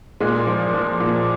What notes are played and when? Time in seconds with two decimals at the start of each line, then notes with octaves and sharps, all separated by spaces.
0.21 A#2 G#3
0.47 F3
0.74 F3
1.00 A#2